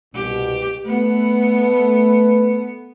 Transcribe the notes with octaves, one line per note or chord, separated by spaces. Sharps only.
C2 B2 G4
A3 B3 A4 B4